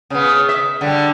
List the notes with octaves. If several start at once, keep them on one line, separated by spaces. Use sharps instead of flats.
C#3 B3
E5
D3 G3